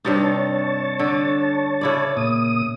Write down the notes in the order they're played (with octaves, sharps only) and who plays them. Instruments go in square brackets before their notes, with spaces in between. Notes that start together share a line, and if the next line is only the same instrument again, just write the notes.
[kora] G2 C3 D#4 [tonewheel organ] C#5 A5
[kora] D3 A4
C#3 E4 D5
[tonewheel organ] A#2 D#6